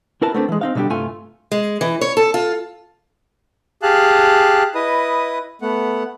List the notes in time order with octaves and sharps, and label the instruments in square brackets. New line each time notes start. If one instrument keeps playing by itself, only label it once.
[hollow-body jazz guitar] E4 A#4 B4 A5
A3 B3 C4 D4 G4 A4
E3 G#3
C4 D#4 F5
B2 D3 G3 D4 G4
C2 G2 A3 F4 G#5
[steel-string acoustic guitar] G#3
E3
C#5
A4
F4
[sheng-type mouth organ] G4 G#4 F5 A5 F#6
E4 B4 D#5 D#6
A3 B3 F#5